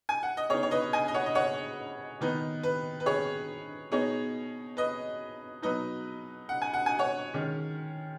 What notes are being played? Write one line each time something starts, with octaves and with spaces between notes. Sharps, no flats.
G#5
F#5
D#5
C#3 B3 D#4 G#4 C#5
C#5
B4 D#5
D#5 G#5
D#5
C#5 F#5
D#5
C#5 F#5
D#3 B3 D#4 B4
B4
B4
G#4 C#5
B2 B3 D#4 G#4 C#5
B4 D#5
B2 F#3 D#4 B4 D#5
F#5
G#5
F#5
G#5
C#5 F#5
D#3 G#3 C#4